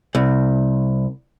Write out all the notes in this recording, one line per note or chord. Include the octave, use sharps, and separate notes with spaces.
C2